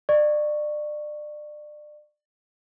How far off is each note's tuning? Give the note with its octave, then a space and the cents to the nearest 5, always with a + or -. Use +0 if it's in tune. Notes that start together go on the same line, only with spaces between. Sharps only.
D5 +30 C#6 +0